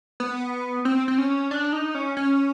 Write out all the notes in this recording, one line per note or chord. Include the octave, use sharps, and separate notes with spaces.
B3
C4
C4
C#4
D4
D#4
C#4
C#4